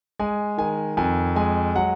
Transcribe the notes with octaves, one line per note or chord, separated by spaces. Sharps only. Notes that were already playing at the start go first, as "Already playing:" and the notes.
G#3 G#5
D#3 G#5
F2 G#5
G#3 G#5
F#3 F#5